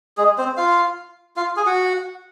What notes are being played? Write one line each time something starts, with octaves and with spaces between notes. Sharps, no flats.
G#3 G#4
C4 C5
F4 F5
F4 F5
G#4 G#5
F#4 F#5